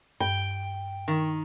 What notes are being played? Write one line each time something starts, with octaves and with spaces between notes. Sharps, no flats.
G2 G5
D#3